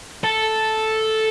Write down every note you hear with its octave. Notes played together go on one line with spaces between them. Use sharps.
A4